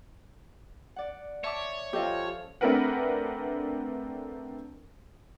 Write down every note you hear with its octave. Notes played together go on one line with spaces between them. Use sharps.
D5 F#5
C#5 E5 A5 D6
F3 C#4 G4 A4 D#5 F5
A3 C4 D4 A#4 B4 F#5